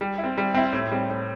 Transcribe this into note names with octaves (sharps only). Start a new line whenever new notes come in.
G3
E4
C4
G3
C4 E4
A2
G3 C4
A2